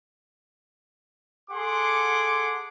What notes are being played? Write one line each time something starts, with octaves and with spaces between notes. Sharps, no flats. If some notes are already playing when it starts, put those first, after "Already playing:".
G#4 A4 F#5 C6 D6